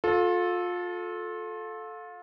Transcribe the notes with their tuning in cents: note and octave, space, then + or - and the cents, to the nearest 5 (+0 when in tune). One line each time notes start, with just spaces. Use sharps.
F4 +30 A4 -10